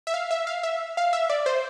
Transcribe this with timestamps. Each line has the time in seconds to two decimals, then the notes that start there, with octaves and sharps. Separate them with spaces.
0.07 E5
0.14 F5
0.31 E5
0.47 F5
0.63 E5
0.97 F5
1.13 E5
1.29 D5
1.46 C5